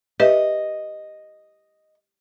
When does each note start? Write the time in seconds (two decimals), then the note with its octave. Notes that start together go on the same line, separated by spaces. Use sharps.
0.20 G4 B4 D#5 E5